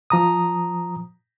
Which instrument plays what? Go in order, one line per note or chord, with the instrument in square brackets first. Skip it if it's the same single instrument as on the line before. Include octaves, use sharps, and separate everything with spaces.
[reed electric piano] F3 A#5 D#6